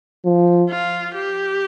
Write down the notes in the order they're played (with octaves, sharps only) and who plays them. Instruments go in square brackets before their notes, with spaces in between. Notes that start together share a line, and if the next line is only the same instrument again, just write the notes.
[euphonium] F3
[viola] F4
G4